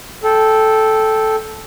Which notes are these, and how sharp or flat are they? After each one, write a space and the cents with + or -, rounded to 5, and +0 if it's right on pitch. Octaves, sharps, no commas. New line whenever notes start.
A4 -10 G5 +0